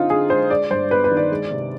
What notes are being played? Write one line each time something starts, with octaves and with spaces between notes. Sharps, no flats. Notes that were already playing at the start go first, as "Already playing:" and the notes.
Already playing: D3 C4 D#4 F4
D3 G#4
G#3 C5
G#3 D5
G2 C5
B3 B4
B4
D#3
D5
G#3
C3